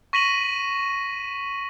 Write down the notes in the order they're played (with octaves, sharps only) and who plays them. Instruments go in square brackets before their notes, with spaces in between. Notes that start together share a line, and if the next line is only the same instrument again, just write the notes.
[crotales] C#6 A#6 B6 D#7 E7 F#7